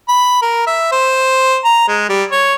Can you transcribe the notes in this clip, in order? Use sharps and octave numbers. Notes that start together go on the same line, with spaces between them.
B5
A#4
E5
C5
A#5
G#3
G3
C#5